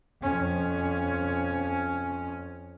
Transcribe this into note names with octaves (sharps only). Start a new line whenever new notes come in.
F2 C#4